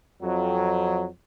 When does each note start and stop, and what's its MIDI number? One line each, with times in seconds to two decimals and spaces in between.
0.22 1.07 41
0.22 1.07 54